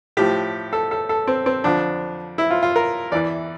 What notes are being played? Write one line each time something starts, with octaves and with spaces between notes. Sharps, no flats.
A2 F3 G4
A4
A4
A4
C4
C4
F2 D3 F3 D4
E4
F4
F4
A#4
E2 E3 D5